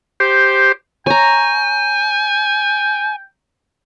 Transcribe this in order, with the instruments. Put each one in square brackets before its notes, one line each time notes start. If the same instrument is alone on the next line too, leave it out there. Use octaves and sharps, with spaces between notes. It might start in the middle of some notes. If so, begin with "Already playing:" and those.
[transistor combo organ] G4 C5
[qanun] C#5 A#5 [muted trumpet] G5 [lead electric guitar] G#5